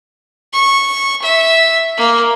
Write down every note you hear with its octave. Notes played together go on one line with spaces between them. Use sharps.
C#6
E5
A#3